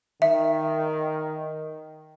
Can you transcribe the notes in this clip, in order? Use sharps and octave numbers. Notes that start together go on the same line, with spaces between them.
D#3 E5